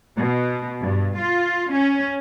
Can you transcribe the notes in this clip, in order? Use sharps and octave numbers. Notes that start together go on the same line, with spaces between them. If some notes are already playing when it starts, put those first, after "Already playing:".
B2
G2
F4
C#4